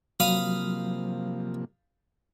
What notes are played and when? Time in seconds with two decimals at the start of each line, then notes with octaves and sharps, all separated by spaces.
0.20 C3 F3 F#3 A#3 F5 B5 D#6